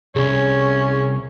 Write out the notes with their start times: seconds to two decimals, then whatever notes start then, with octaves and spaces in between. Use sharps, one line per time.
0.16 C2 C#4 G#4